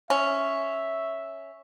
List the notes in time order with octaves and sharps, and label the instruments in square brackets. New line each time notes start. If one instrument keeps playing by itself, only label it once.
[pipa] C#4 [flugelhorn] E5